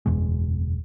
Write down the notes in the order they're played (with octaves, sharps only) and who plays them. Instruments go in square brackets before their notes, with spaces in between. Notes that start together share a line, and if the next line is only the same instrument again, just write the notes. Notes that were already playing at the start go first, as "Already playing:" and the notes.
[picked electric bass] F#1 E2 B2 G#3